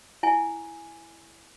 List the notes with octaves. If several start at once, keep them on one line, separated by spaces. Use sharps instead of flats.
E4 G#5